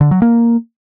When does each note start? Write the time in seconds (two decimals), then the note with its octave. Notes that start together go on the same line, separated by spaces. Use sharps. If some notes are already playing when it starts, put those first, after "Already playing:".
0.01 D3
0.11 F#3
0.22 A#3